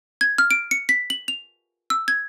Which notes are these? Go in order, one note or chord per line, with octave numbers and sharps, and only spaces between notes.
G#6
F6
D7
C#7
B6
F#7
F7
E6
G#6